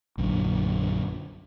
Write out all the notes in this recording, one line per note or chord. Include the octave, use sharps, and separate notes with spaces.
A#1 F#2 D3